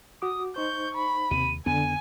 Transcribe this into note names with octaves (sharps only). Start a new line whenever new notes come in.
F#4 D6 D#6
D#4 C5 C#6 G6
B5
D#2 C3 D#7
F2 D3 B3 G#5 D#7